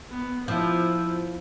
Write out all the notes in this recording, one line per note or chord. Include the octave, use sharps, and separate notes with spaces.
B3
F3 E4